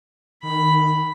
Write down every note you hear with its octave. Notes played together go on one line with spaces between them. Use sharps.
D#3 B5